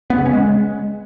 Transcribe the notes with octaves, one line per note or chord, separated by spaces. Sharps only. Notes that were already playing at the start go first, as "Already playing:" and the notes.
B3
C#3
C#4
G#3